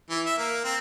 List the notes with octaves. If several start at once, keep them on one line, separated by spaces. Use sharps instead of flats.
E3
E5
A#3
C4